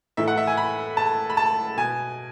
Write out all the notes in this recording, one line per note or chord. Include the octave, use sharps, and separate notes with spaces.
A2 E3 E5
F#5
E5
G#5
B5
A5
B5
A5
B2 G#5